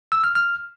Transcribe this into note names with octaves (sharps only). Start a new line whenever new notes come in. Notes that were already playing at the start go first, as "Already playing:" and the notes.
E6
F6
F6